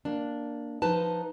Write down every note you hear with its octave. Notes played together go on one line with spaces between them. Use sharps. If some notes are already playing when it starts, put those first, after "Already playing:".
A#3 D4
F3 D#4 B4 A5